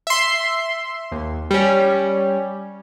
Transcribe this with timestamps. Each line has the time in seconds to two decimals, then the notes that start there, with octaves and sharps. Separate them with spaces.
0.07 E5 C6
1.12 D#2
1.51 G3 C#4